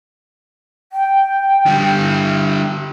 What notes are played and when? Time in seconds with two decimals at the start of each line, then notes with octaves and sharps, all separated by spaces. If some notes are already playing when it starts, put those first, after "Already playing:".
0.92 G5
1.66 D3 G3
1.98 E4